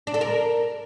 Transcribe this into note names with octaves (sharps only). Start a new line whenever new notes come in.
D4
A4
A#4